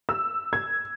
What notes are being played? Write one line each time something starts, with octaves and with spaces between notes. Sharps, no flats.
E6
G#6